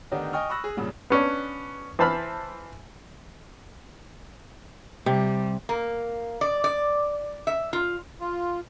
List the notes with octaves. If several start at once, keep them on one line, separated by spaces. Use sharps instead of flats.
D3 D#3 B3 D4 D#4 G4
D#5 G5 G#5 C#6 D#6 F6
B5 C#6 E6 F#6 A#6
G#4
G2 A#2 C#3 G3
B3 C#4 D4
E3 C5 A5 B5 F6
C3 G3
A#3
D5
D5
E5
F4
F4